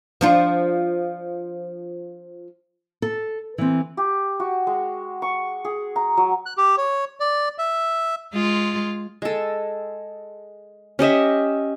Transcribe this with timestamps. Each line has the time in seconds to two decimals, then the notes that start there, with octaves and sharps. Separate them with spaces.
0.21 F3 D4 F4
3.02 A4
3.58 E3 C4
3.97 G4
4.40 F#4
4.67 G#3
5.22 C#6
5.65 G#4
5.96 A#5
6.17 F#3
6.46 F#6
6.57 G4
6.77 C#5
7.20 D5
7.58 E5
8.34 G#3 F4
9.22 G#3 A4
10.99 C#4 G4 D#5 E5